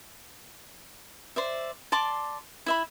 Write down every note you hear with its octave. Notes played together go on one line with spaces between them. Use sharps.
C5 D5 E5
D5 A5 C6 D6
E4 E5 B5